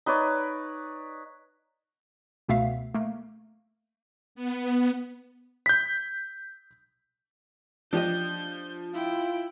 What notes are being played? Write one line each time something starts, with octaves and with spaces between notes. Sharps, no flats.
D#4 B4 C#5 D5
C#2 B2 A3 B3 E5 F5
A3 A#3
B3
G6 B6
F3 D4 G4 D#5 G6
E4 F4 G5